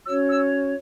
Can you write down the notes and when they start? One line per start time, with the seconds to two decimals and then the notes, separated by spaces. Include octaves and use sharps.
0.06 C#4 F#4 C#5 E6
0.29 E6